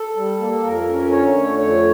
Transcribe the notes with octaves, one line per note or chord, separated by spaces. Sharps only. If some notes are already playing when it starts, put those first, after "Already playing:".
Already playing: A4
G3
A#3
F2 A#4
C#4
D3 C#5
A3
F2 C#5